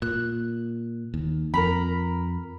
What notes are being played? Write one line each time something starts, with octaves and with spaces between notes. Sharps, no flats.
A#2 F#6
D#2
F2 A#4 A#5 B5